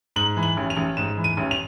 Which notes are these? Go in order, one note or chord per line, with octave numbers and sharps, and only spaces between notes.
G#2 F#7
E3
F#7
A1
F7
A1
G#2 E7
E3
D#7
A1
F7